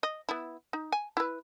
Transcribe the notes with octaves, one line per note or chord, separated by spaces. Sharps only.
D#5
B3 E4
D#4
G#5
E4 B4